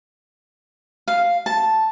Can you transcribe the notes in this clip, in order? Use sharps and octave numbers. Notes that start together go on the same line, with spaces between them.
F5
A5